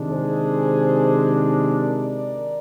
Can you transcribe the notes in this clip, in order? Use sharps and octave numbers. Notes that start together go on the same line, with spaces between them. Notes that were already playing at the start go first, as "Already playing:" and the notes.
Already playing: C3 D#3 G#3 D4
G#4 C5
A#4 D5